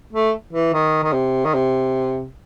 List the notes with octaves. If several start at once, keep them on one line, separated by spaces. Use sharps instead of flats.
A3
E3
D#3
D#3
C3
D#3
C3